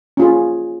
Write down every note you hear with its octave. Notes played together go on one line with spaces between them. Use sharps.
C#4 F4 G#4